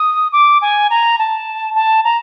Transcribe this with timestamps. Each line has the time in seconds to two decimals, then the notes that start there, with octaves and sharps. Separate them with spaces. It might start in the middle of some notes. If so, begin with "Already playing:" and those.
Already playing: D#6
0.32 D6
0.62 G#5
0.90 A#5
1.19 A5
1.75 A5
2.04 A#5